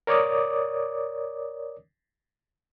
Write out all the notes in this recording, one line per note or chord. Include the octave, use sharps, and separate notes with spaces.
A#4 C#5 D5 D6 D#6